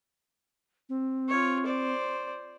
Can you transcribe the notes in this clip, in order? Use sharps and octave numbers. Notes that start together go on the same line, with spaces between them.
C4
F4 C#5
C5 D5